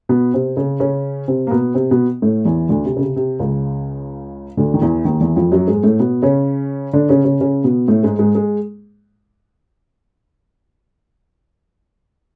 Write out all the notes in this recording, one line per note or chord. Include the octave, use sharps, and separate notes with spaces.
B2 B3
C3 C4
C#3 C#4
C#3 C#4
C3 C4
A#3
B2 B3
C3 C4
B2 B3
A2 A3
E2 E3
D2 D3
C3
C#3
C3
C3
C#2 C#3
D2 D3
D#3
E2 E3
D#2 D#3
E2 E3
F2 F3
F#2 F#3
G#2 G#3
A2 A3
B2 B3
C#3 C#4
D3 D4
C#3 C#4
C#3 C#4
C#3 C#4
B2 B3
A2 A3
G#2 G#3
G#2 G#3
G#3